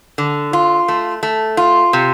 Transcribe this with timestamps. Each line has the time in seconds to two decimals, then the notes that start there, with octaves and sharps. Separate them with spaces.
0.18 D3
0.53 F4
0.88 A3
1.23 A3
1.57 F4
1.93 C3